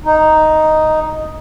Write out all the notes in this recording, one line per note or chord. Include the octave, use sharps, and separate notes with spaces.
D#4